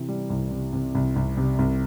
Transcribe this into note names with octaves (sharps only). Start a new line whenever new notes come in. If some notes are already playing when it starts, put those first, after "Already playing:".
Already playing: C3 E3
G3
C2
C3
C3
C2
C2
C3
C2